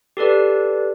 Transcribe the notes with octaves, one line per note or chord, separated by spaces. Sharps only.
G4 A4 B4 D5